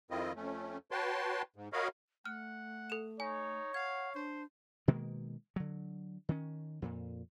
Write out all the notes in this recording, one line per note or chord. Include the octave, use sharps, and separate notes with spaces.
F2 D#3 C4 E4 F4 D#5
F2 A3 C#4
F#4 B4 C#5 G5 A5 C6
G#2
F#4 A#4 C#5 D#5 F5 B5
A3 F#5 F6
A4 E7
D#4 C#5 G#5
F5 F#5 G#6
D4 C5
B2 D#3 G#3 A#3
D3 F#3
D#3 C#4
F2 A#2